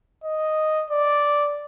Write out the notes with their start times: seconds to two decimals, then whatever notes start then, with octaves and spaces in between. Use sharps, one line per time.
0.24 D#5
0.91 D5